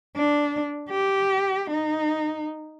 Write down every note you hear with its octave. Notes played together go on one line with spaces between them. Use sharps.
D4
G4
D#4